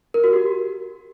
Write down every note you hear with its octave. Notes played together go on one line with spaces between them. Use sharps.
A#4
F#4
G4